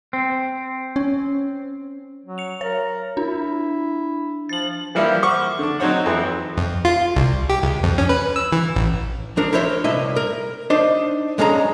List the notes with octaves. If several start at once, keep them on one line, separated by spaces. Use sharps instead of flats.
C4
C#4
F#3
C#7 F7
A#4 C#5
D4 E4
F3 A6 F#7
E3 F3 G3 A#3 E4
C5 F#5 C#6 D6 F6
D3 D4
F#3 C4 D#4 C5 C#5 F#5
F2 E3
F2
F4
C2
G4
C#2
F2
C#4
B4
E6
E3
A1
F3 D4 A#4
E4 A#4 C5 C#5 E5
C2 G2 E4 D#5 E5
A#4
D4 D#4 C5
G2 G#3 C#4 A4 E5 A#5